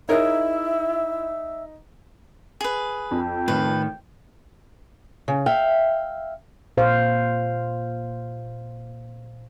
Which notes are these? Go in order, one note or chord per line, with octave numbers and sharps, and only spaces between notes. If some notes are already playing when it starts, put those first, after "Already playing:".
D#4 E4 G#4 A#4 C#5 E5
G#4 B4
F2 G5
A2 D#3 B4
C#3
E5 F5 G5
A#2 C5 F5